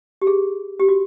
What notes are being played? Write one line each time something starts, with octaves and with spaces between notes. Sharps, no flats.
G4
G#4
G4
F#4